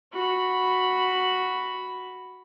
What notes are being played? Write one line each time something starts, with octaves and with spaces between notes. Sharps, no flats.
F#4 B5